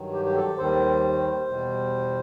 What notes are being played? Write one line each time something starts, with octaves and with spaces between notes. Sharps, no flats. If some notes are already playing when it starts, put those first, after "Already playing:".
Already playing: G2 D#3 F#3
G4
G4
A4
D#2 D#3 G3 C5
E2 B2 G3